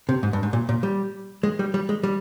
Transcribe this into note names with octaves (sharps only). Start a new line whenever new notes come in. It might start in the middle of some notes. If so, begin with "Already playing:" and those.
C3
G#2
G2
G#2
A#2
A#2
G3
G#3
G3
G3
G#3
G3